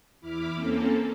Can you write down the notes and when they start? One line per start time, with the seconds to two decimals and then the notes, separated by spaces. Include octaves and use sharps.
0.21 E2 E4 B5 D6 F6
0.54 A#3 C4 C#4 A4